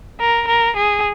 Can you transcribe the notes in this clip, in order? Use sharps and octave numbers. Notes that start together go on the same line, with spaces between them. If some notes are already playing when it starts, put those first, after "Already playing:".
A#4
A#4
G#4